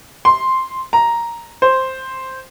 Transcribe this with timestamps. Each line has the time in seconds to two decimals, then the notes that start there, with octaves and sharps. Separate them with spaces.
0.25 C6
0.93 A#5
1.62 C5